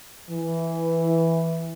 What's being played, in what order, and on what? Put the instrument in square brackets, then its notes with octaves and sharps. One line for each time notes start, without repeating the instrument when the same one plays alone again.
[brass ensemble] E3